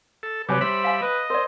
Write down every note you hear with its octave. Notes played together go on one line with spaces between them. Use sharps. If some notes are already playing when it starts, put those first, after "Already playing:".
A4
C3 F#3 G3 B4 C#5 G#5 D6
G3 C5 E5 B5
F5 G#5
B4 D#5
A#4 C5 D5